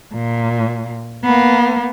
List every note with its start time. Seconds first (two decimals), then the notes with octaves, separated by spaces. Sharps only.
0.14 A#2
1.24 A#3 B3